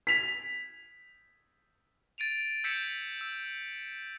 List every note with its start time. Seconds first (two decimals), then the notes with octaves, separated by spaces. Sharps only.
0.07 B6 F7
2.18 A6 D7 D#7 F7
2.64 E6 G6 G#6 B6 C#7 E7
3.21 E6